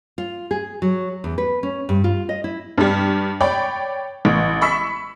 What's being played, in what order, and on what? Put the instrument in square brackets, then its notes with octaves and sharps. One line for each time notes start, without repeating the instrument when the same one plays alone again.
[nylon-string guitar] F4
G#4
F#3
E2
B4
C#4
G2
F4
D#5
E4
[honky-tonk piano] G2 G3
C#5 D5 G5 B5
A1
B5 C#6 E6 B6